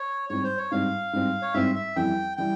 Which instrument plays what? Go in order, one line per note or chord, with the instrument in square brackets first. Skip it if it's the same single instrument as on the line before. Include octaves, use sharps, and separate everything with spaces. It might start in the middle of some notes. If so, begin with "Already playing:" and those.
Already playing: [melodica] C#5
[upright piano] G#2 G3 C4 [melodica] C#5
[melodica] C5
C#5
[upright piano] G#2 G3 C4 [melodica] F5
[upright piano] G#2 G3 C4
[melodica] C#5
[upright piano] G#2 G3 C4 [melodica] E5
[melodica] E5
[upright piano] F2 E3 G3 [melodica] G5
[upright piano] E3 G3 [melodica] G5